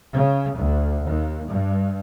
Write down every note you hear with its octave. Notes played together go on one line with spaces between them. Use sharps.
C#3
D2
D#2
G2